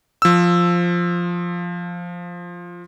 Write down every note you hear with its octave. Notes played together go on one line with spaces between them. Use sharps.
F3 E6